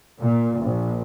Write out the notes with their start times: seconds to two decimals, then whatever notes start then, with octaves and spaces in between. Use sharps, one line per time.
0.19 A#2
0.59 A#1